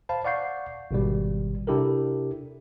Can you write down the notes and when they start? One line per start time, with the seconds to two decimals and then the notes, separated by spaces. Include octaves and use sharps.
0.09 C5 F5 A5 B5
0.25 D5 F5 F#5 C#6 G6 C7
0.91 G#1 B2 G3
1.67 C3 D4 E4 G4 A4 A#4